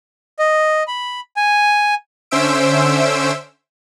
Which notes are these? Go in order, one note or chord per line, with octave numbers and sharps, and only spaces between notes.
D#5
B5
G#5
D3 C#4 C5 E5 E6 D7